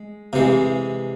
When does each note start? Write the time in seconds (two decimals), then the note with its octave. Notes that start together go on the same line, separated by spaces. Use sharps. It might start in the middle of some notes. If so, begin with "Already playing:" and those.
Already playing: G#3
0.33 C3 E3 G#3